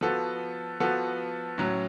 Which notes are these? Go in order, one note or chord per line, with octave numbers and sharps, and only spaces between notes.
F3 B3 F#4 A4
F3 B3 F#4 A4
A2 F#3 C#4